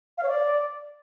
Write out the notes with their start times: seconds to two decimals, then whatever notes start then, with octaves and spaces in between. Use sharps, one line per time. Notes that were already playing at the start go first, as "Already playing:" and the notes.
0.17 F5
0.23 C#5
0.28 D5